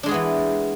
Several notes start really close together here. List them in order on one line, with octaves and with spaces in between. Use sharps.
D4 G#3 G#4 B3 E3